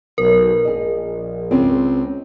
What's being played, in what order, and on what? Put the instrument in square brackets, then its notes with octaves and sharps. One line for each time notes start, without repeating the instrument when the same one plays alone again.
[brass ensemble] B1 [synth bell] A#4
[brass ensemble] A#1 [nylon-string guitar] G#4 D#5
[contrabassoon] C#2 [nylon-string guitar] C4 C#4 C5